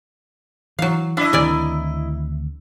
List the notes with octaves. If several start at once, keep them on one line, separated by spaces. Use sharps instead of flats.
E3 F#3 F5
D4 E4 D#5
D2 D#3 C4 A#4 D5 G#5